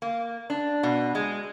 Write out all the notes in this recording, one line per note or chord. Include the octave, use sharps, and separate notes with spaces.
A#3
D4
B2
G#3